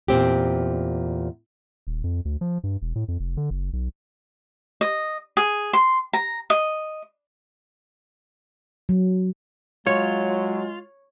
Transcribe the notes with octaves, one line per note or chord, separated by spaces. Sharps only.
E2 A#2 C4 G4
D#1
F2
D2
F3
G2
E1
A2
F2
F1
D3
F#1
B1
D#5
G#4
C6
A#5
D#5
F#3
F#3 G#3 F4 C#5